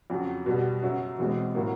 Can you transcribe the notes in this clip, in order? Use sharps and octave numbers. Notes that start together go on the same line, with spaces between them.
F2 C#3 F#3
B2 G3 B3
F#2 C#3 F#3
E2 B2 G#3 C4
A2 F#3 A#3